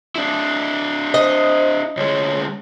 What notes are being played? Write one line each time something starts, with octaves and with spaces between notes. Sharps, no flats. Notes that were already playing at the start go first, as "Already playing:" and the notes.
D4 E4
C5 D#5
D2 G#3 C#5